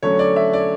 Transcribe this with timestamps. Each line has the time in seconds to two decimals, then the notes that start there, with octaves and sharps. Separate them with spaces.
0.03 D3 F#3 A3 C#4 C#5
0.19 D5
0.36 E5
0.53 D5